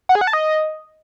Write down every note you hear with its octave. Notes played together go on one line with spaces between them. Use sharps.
F#5
G#4
F#5
A5
D#5